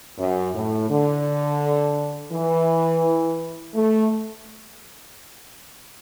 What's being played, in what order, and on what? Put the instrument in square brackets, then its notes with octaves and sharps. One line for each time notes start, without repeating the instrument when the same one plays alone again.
[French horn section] F#2
A2
D3
E3
A3